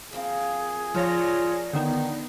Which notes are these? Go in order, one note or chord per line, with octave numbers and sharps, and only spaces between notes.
F3 A#3 C4 G#4
F3 A#3 D4 F4 C#5 A#6
D3 D#3 B3 D#4